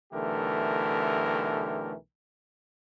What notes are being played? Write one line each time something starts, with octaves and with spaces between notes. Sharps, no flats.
B1 D3 E3 A3 G4 A#4